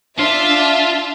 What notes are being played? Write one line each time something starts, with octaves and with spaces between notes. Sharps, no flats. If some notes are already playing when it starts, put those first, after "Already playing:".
D4 F4 E5